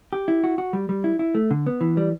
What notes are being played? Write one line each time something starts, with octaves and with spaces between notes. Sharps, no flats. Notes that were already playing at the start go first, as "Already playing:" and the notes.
G4
E4
F#4
F#4
G3
G3
E4
E4
A3
D3
B3
E3
G3